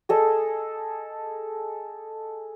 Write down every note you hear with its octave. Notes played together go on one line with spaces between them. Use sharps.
G#4 A4 D#5